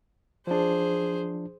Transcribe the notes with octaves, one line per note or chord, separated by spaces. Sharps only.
F3 D4 G#4 C5